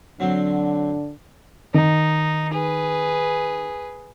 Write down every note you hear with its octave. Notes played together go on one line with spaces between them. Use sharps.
D3 F#3 C4 D4
D#3 D#4
G#4 B4